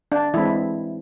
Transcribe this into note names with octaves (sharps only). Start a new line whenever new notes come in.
D4
E3 G#3 C4 E4